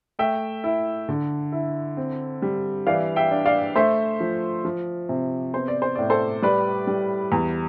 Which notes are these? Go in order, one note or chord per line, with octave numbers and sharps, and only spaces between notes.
A3 E5 G5
E4
D3
E4
C4
G3
E3 D5 F5
E5 G5
D4
D5 F5
A3 C5 E5
F3
F3
C3
B3 C5
D5
C5
A2 D5
A4 C5
G3 B4 D5
G3
E2